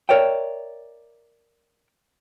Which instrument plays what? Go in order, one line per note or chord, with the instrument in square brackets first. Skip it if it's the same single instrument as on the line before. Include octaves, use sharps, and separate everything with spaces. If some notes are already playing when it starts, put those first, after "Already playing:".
[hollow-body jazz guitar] A#4 C#5 D5 E5 G5